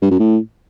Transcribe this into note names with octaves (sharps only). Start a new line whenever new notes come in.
G2
F#2
A2